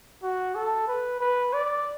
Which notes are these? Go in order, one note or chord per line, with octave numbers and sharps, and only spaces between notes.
F#4
A4
B4
B4
D5